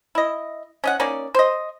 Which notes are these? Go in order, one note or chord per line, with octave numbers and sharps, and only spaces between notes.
E4 D#5
C#4 D#5 F#5
A#3 C#4 D#4 D5
C5 D#5